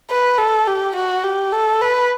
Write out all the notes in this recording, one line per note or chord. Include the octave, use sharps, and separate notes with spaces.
B4
A4
G4
F#4
G4
A4
B4